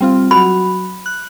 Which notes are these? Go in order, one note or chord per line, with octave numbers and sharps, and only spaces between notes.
G3 C4 F4
F#3 F#4 B5
F#6